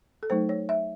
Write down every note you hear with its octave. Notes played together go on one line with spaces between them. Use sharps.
A4
F#3 A3 D#4 C5
C#5
E5